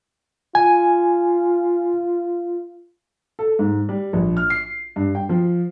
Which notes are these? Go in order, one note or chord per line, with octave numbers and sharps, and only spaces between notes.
F4 G#5
A4
G#2
G3
A#1
F6
C7
G2
G5
F3